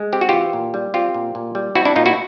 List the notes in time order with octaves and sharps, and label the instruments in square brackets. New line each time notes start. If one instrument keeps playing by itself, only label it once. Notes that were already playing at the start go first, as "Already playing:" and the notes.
Already playing: [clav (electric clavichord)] G#3
C4 G4
F#4
E3 F4 G4
A#2
G3
C4 F4 G4
A#2
A#2
G3
C4 E4 F#4
D4 E4
A#2 D#4 F4
E4 F#4